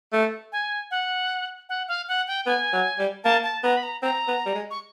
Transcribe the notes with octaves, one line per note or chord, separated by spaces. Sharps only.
A3
G#5
F#5
F#5
F5
F#5
G5
B3 G#5
F#3
G3
A#3 A5
A5
B3 A#5
B5
A#5
C4 A#5
B3
G3
G#3
C#6